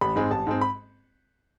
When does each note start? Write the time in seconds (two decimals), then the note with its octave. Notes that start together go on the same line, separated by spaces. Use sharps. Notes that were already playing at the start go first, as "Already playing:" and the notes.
0.01 A1 B5
0.16 G#2 G#3 C4
0.31 A1 A5
0.47 G#2 G#3 C4
0.61 B5